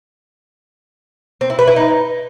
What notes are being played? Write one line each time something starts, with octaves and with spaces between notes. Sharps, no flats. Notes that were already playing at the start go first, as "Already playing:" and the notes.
C4
E4
B4
E4
D#4